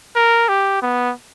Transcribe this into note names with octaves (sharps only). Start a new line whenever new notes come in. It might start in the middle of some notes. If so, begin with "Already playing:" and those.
A#4
G4
B3